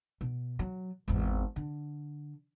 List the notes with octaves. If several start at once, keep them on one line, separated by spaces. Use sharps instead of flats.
B2
F#3
G#1 E2
D3